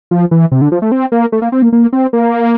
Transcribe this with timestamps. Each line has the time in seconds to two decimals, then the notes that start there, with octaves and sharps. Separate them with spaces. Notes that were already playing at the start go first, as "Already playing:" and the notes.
0.11 F3
0.31 E3
0.52 C3
0.62 D3
0.72 F3
0.82 A3
0.92 C4
1.12 A#3
1.32 A3
1.42 A#3
1.52 C4
1.62 A#3
1.73 A#3
1.93 C4
2.13 A#3